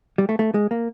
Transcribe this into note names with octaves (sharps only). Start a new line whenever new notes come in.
G3
A3
A3
G#3
A#3